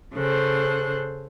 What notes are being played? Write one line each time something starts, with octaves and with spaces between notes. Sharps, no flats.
C#3 A4 C5 F#6